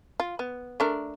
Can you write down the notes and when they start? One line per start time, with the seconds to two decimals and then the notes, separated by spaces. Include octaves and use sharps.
0.20 F4
0.39 B3
0.80 A3 D4 A#4